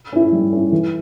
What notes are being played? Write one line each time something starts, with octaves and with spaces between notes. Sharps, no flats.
C#4 E4
G3
C#4 E4
E3